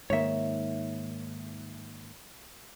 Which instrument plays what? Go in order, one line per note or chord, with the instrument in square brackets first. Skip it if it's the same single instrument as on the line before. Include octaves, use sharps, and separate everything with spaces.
[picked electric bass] G#2 D#3 A#3 [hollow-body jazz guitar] C#5 E5